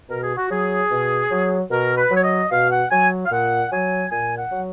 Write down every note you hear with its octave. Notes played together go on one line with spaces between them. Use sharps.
B2 A#4
G#4
F#4
F#3 G#4
B2
F#3
B2 A#4
B4
F#3
C#5
D#5
B2 F5
F#5
F#3 G#5
F5
A#2 F#5
F#3 G#5
A#2 G#5
F#5
F#3